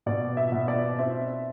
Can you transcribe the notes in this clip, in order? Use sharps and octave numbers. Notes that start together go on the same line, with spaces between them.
B2 D5
E5
B2
D5
C4 E5